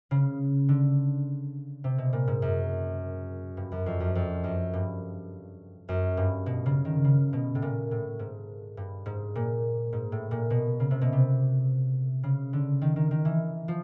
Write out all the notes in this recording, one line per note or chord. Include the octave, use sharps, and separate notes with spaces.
C#3
D3
C3
B2
A#2
G#2
F#2
G2
F#2
F2
F#2
F2
F#2
G2
F#2
G2
B2
C#3
D#3
C#3
B2
A2
A#2
A2
G#2
G2
G#2
A#2
G#2
A2
A#2
B2
C#3
C3
B2
C3
C#3
D3
D#3
D#3
D#3
E3
F3